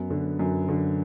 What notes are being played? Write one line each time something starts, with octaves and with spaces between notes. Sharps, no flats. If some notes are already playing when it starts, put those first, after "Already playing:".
Already playing: F#2 B3
D3
F#2
D3